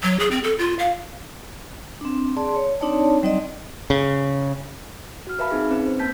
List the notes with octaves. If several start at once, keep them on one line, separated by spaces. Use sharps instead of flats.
F#3
G#4
C4
A4
F4
F5
C4 D4
G#4 D5 A5 C6
C#5
C4 D4 D#4 C#5 D5 A5
F#3 G3 C4 D#4 D5 D#5
C#3
F#4 F6
A#4 B4 E5 F5 A5 B5
C4 D#4 G#4
C4 C#4 B4
C5
A#3 A5 G6 B6